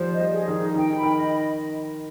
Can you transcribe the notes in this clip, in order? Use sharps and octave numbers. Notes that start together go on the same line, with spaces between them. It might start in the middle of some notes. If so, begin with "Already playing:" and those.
Already playing: D#3 F3 G3 C5
D#5
G3
G#4
D#3
D#4
D#3 G5
B5
D#3
D#5